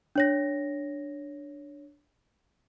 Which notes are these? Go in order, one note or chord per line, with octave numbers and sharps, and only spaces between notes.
D4 C#5 A#6